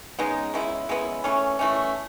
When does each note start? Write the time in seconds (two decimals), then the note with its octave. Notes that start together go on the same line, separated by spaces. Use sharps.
0.19 C#3 G#3 B3 D#4
0.54 C#3 G#3 B3 E4
0.89 C#3 G#3 B3 E4
1.24 E3 A3 C#4
1.59 E3 A3 C#4